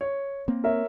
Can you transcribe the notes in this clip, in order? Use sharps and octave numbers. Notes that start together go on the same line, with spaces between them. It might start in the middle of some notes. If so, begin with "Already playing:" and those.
C#5
A#3 C4
A#4 C#5 E5